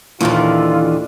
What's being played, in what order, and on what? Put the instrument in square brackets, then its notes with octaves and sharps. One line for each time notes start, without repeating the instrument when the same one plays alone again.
[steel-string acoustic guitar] D#2 A#2 D3 [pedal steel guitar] E3 [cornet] F4